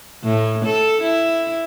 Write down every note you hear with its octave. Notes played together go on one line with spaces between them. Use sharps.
A2
A4
E4